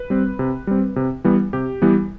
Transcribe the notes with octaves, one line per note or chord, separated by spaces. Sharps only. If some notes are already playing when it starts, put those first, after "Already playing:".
Already playing: B4
G3 C4
C3
G3 C4
C3
E3 G3 B3
C3 G4
E3 G3 B3